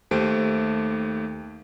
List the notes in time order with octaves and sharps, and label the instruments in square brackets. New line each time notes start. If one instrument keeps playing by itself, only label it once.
[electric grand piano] D#2 A3 G4 C5 D7